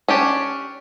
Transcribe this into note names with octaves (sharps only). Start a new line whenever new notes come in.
C#4 D4 G4